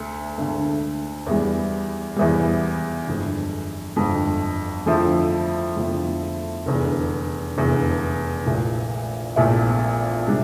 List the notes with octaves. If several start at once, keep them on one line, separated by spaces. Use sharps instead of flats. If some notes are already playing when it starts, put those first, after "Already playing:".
Already playing: D2 A3
D2 D3 A3
E2 E3 G3
E2 E3 G3
G1 F2 D3
G1 F2 D3
F2 D3 F3 A3 E4
F2 D3 F3 A3 E4
F1 E2 D3
F1 E2 D3
A#1 A#2 A3 E4
A#1 A#2 A3 E4
C3 G3 D4